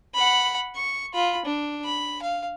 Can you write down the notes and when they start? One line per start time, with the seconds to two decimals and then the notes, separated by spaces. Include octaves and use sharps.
0.15 F#5 B5
0.75 C#6
1.14 F4 B5
1.45 D4
1.85 B5
2.22 F5